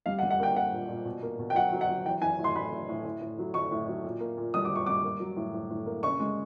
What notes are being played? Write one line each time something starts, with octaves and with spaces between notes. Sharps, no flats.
G3 F5
F#5
G3
F#5
A#3 G5
A#3 F#5
A#2
A#2
B2
A#3
B2
G5
F#3 F#5
F#3
F#5
F#3
E3 G5
E3 G#5
A2
C6
A2 B5
A2
A2
A2
A2
F#3
F#3 C#6
A2
F#3
A#2
A#3
A#2
G3 D#6
D6
A#2
C#6
G3 D6
A#3
F#3
A2
A2
A2
A#3
C#3 C#6
G#3